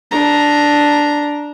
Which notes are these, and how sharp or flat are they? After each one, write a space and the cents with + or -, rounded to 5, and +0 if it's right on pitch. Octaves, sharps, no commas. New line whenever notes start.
D4 +0 A#5 +10